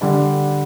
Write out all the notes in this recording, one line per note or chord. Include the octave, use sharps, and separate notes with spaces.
D3 G3 D4